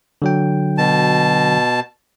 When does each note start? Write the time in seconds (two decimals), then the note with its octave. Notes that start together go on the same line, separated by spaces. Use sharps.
0.22 D3 F#3 G5
0.78 B2 A5